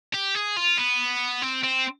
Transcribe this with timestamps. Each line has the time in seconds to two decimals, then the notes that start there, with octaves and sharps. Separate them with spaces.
0.14 G4
0.35 G#4
0.56 F4
0.78 B3
1.42 C4
1.64 C4